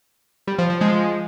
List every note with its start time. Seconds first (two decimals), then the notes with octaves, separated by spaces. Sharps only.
0.47 G3
0.58 F3
0.70 F3
0.81 F3 G#3